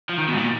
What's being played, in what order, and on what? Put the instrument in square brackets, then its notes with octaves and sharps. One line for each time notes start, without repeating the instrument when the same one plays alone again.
[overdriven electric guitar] F3
D#3
B2
G#2
A#2